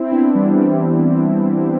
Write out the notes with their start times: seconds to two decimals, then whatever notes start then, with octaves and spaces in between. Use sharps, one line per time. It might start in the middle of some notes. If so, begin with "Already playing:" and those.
Already playing: C4 E4
0.12 B3 D4
0.35 E3 G3